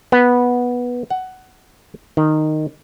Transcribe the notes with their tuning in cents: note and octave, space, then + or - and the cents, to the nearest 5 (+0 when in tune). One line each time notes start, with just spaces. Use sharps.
B3 -10
F#5 +10
D#3 -10